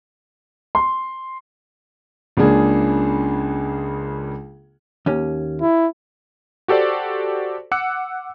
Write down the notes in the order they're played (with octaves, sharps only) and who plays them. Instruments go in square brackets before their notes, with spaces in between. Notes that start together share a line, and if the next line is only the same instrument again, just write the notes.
[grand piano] C6
C#2 C#3 A#3 D4 G#4
[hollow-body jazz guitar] D#2 C#4
[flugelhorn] E4
[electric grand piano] F#4 G4 A4 C5 D5
F#5 D6 E6 F#6 C#7